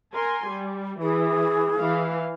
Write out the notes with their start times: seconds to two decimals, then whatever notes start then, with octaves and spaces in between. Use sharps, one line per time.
0.13 A#4 G#5 C6
0.47 G3
1.02 E3 G#4
1.79 E3 F5